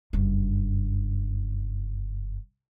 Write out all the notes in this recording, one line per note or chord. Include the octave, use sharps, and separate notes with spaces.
F#1 G2